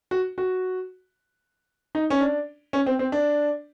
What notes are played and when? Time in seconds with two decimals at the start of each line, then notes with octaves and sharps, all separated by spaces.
0.11 F#4
0.38 F#4
1.95 D#4
2.10 C#4
2.21 D4
2.73 C#4
2.86 C4
2.99 C4
3.12 D4